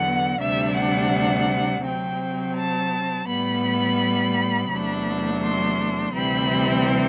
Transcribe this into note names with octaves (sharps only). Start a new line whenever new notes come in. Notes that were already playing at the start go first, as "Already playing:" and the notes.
Already playing: E2 D3 F#3 B3 F#5
D2 C3 G3 D4 E5
F#5
C3 F#3 C4 G5
A5
A2 G3 B3 B5
E2 C3 F#3 A3 D4
C6
D2 C3 E3 G3 C4 B5